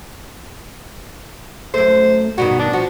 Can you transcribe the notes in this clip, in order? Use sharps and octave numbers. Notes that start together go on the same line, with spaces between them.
F#2 A3 C5
G2 B2 D#3 F#4
D4
F3 F#4